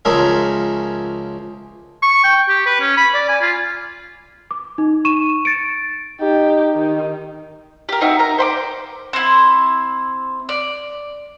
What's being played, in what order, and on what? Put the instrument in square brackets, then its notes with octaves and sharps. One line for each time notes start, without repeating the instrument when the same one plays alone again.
[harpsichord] C#2 F3 C#4 G#4 A#4 E5
[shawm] C#6
G5
G4
B4
C#4
B5
D5
G#5
F4
[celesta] D6
D#4
C#6 D#7 E7
A6 C#7 D7
[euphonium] D#4 [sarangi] G4
[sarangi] D#3
[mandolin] G4 A#4
C4 D#4 F#4 E5
A#4 A#5
C5 B5 D6
C4 E4
D5